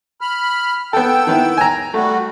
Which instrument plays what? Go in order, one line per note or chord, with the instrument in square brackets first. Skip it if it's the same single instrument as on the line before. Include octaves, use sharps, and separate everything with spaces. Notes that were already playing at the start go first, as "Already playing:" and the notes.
[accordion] B5 F6
[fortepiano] B3 A4 [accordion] G5 E6
[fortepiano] D#3 B3 E4
G#5 A#5
[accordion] G3 F#4 [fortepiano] A3